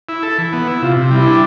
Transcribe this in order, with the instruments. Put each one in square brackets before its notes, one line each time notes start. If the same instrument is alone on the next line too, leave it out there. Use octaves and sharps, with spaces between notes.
[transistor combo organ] E4
A4
E3
B3
E4
[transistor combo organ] C3 [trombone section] F4
[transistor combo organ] C3
[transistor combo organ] G3 [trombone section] E4
[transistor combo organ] D4